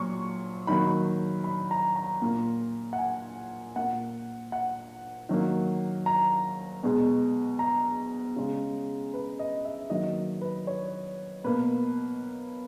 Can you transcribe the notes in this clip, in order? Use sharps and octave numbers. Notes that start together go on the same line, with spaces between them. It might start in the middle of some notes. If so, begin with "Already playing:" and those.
Already playing: A#2 F#3 C#6
D#3 F#3 A#3 B5
B5
A#5
A#5
A#2 A#3
F#5
G#5
A#2 A#3 F#5
F#5
D#3 F#3 A#3
A#5
B2 G#3
A#5
C#3 G#3
B4
D#5
E5
D#3 F#3 A#3 D#5
B4
C#5
B2 A#3 B4